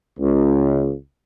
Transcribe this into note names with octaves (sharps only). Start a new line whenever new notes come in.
C#2